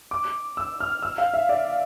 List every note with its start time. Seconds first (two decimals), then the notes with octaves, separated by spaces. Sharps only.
0.11 D6
0.57 E6
0.80 F6
1.03 E6
1.18 F5
1.34 E5
1.49 D5